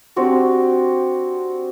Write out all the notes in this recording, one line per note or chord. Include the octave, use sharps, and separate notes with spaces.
C4 D4 F#4 G4